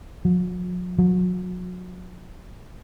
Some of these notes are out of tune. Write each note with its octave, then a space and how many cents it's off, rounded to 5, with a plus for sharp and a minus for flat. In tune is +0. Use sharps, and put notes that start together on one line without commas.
F#3 -45
F#3 -35